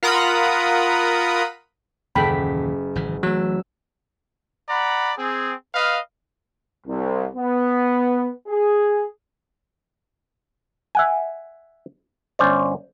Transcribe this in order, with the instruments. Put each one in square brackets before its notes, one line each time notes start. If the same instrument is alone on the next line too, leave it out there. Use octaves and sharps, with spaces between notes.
[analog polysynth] F4 A#4 F#5 A#5 B5 D#6
[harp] F#1 B6 [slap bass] D#2 A#2 E3 [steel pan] A4 G5 B5
[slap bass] G#1 C#3 E3
[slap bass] E3 A3 [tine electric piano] F#3 [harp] E6
[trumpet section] D5 F#5 A#5 B5
C4 G#4
B4 D#5 F5
[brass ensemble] C2
B3
G#4
[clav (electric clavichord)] E5 F#5 G#5
G1 C#4 C5 D5